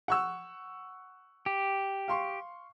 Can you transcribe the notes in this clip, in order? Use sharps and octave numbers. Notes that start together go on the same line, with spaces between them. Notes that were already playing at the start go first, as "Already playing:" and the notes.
F#5 C#6 E6
G4
F5 C6 C#6